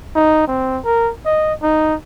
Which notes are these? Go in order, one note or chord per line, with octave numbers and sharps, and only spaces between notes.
D#4
C4
A#4
D#5
D#4